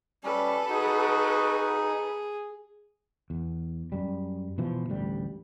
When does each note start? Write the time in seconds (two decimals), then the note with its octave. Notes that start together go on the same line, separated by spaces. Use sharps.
0.24 G3 C#4 A4 B4
0.69 D#4 F#4 G#4
3.30 E2
3.92 F#2 G3
4.58 B2 E3 F3
4.89 A1 D2 G3